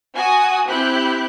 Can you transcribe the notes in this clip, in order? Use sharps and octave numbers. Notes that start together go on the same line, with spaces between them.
F#4 G#5 D#6
C4 E4 G4 F#6 G6